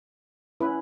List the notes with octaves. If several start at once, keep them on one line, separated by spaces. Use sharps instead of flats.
C#4 E4 B4